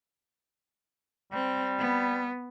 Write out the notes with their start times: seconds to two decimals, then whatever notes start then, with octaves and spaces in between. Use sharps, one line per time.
1.33 G3 C4
1.79 B3